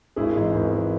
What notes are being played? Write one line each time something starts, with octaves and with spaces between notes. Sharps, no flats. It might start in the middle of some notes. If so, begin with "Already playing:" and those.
G#1 E4 G#4
G#2 E3
G#1
E3